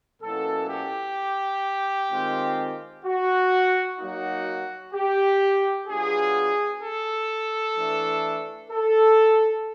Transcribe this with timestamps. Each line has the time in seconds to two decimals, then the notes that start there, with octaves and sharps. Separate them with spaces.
0.22 B2 F#3 A#3 C#4 E4 A4
0.69 G4
2.10 D#3 G#3 C4 F4
3.05 F#4
3.99 F#3 A#3 D#4 F#4
4.94 G4
5.88 F#3 B3 D4 F4 G#4
6.82 A4
7.76 E3 A3 D4
8.71 A4